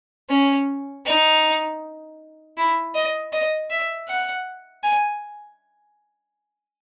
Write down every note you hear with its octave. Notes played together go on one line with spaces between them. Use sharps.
C#4
D#4
E4
D#5
D#5
E5
F#5
G#5